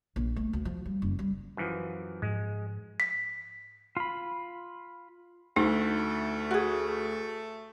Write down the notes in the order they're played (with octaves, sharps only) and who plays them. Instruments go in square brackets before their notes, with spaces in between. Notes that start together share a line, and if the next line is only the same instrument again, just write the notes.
[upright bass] A#1
A3
D2
F3
G3
F#1
G3
[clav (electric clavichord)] F#2 E3 F3
[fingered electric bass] G#2 F3 [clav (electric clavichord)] G#3
[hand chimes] B6
[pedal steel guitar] F4 B5
[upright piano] D2 [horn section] A3 [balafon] D#4
[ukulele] F#4 G#4